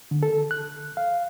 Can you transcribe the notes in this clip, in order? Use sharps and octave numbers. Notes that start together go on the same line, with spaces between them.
D3
A4
F#6
F5